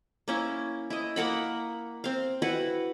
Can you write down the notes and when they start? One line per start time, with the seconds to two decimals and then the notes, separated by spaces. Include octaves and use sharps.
0.28 A#3 C#4 E4
0.90 E4 D#5
1.16 A#3 A#4 F#5 B5
2.04 C4 F5
2.42 E4 F#4 B4 F#5